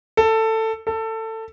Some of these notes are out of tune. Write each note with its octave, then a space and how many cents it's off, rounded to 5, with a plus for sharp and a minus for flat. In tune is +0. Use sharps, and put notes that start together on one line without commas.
A4 +15
A4 +20